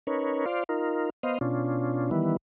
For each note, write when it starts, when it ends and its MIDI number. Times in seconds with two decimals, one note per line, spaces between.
0.07 0.45 61
0.07 0.45 63
0.07 0.45 70
0.07 0.45 71
0.07 0.45 73
0.46 0.64 65
0.46 0.64 72
0.46 0.64 74
0.46 0.64 77
0.69 1.10 63
0.69 1.10 65
0.69 1.10 70
1.23 1.38 59
1.23 1.38 72
1.23 1.38 75
1.23 1.38 77
1.41 2.10 47
1.41 2.10 61
1.41 2.10 62
1.41 2.10 65
2.11 2.37 51
2.11 2.37 52
2.11 2.37 55
2.11 2.37 59
2.11 2.37 64